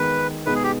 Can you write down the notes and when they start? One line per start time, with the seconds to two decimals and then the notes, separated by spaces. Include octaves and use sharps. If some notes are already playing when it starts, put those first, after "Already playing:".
Already playing: D#3 G#3 B3 B4
0.46 B2 G#3 B3 D#4 B4
0.55 G#4
0.63 G4